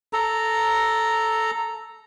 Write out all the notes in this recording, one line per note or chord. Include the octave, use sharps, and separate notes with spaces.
A4 A#5